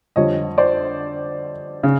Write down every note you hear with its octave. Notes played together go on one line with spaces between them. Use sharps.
F2 D3 G3 C#5 D#5
C5 D5
C#3